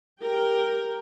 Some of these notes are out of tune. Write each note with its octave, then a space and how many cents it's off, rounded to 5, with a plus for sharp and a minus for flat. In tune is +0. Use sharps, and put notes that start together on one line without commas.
G4 +5 A#4 +0 G5 +0